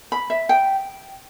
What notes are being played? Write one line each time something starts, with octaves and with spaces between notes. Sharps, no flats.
B5
E5
G5